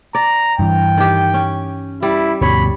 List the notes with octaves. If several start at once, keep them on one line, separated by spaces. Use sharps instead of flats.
D5 A#5
G2 E3 G5
D#3 G4
C#4
G3 E4
D2 G2 B2 C#5 B5